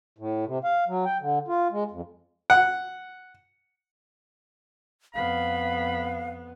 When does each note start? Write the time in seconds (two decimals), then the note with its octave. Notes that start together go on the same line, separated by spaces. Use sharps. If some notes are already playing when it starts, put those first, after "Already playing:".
0.19 A2
0.46 C3
0.64 F5
0.87 F#3
1.06 G5
1.21 D3
1.48 F4
1.72 G#3
1.91 F2
2.50 F#5
5.15 F2 B3 F5 B5